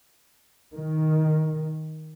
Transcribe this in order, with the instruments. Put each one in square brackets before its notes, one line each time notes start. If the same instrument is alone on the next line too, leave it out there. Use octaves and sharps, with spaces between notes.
[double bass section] D#3